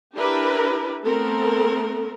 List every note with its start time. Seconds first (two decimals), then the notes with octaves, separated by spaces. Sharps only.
0.14 D4 E4 G4 A#4 B4
1.02 A3 B3 C4 A4 A#4